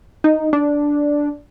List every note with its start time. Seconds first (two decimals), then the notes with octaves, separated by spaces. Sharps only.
0.24 D#4
0.53 D4